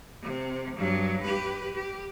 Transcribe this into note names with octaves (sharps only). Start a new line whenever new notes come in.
C3
G2 F#3
G4 B4
G4